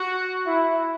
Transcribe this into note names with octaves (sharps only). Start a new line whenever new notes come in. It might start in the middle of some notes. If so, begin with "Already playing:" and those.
Already playing: F#4
E4